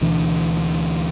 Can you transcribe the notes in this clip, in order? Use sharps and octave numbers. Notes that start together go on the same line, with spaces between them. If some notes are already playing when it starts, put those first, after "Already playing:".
D2 B2 E3 D4